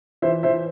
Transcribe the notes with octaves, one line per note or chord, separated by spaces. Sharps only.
E3 C5 E5
E3 C5 E5